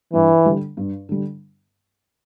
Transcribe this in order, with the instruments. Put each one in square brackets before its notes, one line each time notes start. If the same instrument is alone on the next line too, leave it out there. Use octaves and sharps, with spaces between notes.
[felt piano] G2 [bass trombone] E3
[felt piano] D3 G3
G2
D3 G3